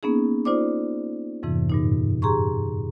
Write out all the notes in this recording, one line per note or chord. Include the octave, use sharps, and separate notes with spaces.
A#3 B3 C#4 D#4 G#4
D#4 F4 C5 D5 D6
F2 G#2 C3 E3
G2 A#2 D#4
G4 G#4 A#5 C6 C#6